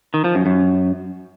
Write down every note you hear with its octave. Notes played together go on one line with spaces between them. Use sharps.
D#3
F3
F#2
F#2